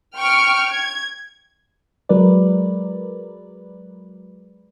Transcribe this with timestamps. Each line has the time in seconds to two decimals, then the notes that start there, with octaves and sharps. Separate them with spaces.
0.17 G5 C#6 F6 D7
0.71 G#6
2.09 F#3 G#3 A#4 B4 D5